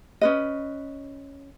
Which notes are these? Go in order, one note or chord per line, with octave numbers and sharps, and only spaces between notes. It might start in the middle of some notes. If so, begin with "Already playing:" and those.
C#4 B4 D#5